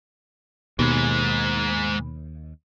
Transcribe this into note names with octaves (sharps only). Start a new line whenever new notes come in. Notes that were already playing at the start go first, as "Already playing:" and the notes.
D#2 G#2 B2 G#3